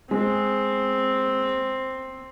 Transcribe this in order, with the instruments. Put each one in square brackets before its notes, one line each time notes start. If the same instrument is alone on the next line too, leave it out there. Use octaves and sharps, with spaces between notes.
[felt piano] G#3 [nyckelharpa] C4